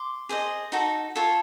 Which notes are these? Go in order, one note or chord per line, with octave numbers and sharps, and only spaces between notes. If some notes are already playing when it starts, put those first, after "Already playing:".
Already playing: C6 D6
G#4 C5 D#5
D#4 F#4 A4
F4 A4 C#5